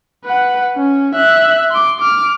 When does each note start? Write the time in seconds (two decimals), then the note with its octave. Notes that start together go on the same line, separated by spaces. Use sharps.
0.25 B4 F#5
0.76 C#4
1.15 E5 F#6
1.71 C6 D6
2.00 D6 F6